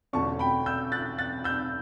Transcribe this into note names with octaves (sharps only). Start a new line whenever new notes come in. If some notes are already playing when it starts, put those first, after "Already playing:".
E1 E2 D3 A3 C#4 A5 C#6
G5 B5
E6 G6
F#6 A6
F#6 A6
E6 G6